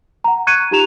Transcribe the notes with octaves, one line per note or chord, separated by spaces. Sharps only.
F#5 A#5
C#6 F#6 G#6 C#7 D#7
D#4 F4 G4 A#5 E7 F7